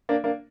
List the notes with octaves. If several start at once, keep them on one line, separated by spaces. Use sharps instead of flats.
A#3 D4
A#3 D4